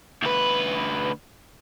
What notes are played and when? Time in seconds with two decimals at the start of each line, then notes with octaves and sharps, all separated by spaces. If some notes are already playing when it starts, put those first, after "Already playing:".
0.22 D2 B4